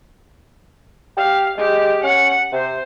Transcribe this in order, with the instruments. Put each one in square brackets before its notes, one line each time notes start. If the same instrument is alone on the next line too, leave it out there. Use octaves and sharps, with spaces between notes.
[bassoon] G4 [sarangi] F5
[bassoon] G#3 [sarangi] G4
[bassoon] C#4 [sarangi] F#5
[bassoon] C3 [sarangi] C5